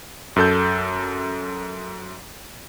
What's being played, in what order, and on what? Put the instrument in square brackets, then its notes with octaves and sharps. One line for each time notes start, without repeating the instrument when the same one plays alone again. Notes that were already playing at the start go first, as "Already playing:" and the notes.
[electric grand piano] F#2 A4 G6